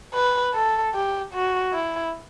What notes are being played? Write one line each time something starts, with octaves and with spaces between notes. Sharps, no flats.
B4
A4
G4
F#4
E4